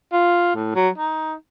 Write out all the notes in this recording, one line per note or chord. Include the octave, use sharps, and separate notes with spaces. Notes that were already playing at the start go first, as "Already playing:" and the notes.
F4
A2
F#3
D#4